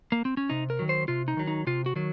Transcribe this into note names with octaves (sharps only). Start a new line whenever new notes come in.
A#3
C4
C#4
C3 D#4
A#4
D#3 F#3
C5
C3 F4
D#4
D#3 F#3
D#4
C3 F4
F#4
D#3 F#3